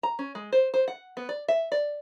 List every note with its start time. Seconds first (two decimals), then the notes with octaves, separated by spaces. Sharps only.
0.03 A#5
0.19 C#4
0.35 G#3
0.52 C5
0.74 C5
0.88 F#5
1.17 B3
1.29 D5
1.48 E5
1.72 D5